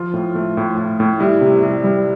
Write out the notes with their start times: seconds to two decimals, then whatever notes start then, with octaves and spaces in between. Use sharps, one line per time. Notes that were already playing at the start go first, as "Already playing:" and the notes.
Already playing: F3 F4
0.14 A2
0.35 A3
0.57 A2
0.78 A2
1.00 A2
1.20 G3 E4
1.41 C3
1.63 G3
1.84 G3